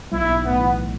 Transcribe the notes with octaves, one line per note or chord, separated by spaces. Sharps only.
B1 E4
B1
A2 B3
E3